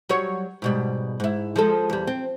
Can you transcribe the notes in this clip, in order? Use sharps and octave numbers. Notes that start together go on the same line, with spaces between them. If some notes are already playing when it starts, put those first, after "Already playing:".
F#3 G3 C#5
G#2 B2 G3
G#2 E4
F3 G#3 A4
E2 G3
C4